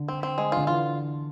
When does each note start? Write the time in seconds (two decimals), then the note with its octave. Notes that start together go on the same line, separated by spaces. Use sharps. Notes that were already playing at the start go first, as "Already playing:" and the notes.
Already playing: D3
0.08 C4
0.23 C4
0.38 G#3
0.52 D3 F4
0.67 E3 F4